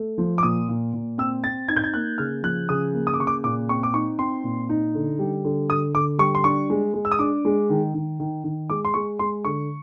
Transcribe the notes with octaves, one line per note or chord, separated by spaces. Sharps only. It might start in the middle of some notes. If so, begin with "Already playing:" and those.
Already playing: A3
F3
D6
A#2 D#6
A#2
A#2
C4 E6
C4 A6
D#4 G#6
G6
G#6
A#3 F#6
C#3 F6
F3 F#6
C#3 D#6
A#3
D#6
D6
C#3 C#6
D6
A#2 D6
C4 C#6
D6
D#4 C#6
C4 C6
A#2
D#4
D3
G3
D3
D3 D#6
D3 D6
G3 C#6
C6
D4 C#6
G#3
G#3
E6
D#6
D4 D6
G#3
D#3
D#3
D#3
D#3
G#3 D6
C6
G#3 C#6
G#3 C6
D3 C#6